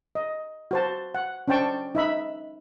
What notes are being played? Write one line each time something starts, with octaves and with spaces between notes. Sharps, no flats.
D#5
F#4 C5 A5
F#5
C#4 D4 C5 G5 A5 C#6
D#4 E5 B5